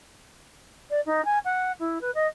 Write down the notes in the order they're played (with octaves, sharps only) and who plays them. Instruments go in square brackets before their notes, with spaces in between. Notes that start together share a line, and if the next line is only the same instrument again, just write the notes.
[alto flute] D5
D#4
G#5
F#5
E4
B4
D#5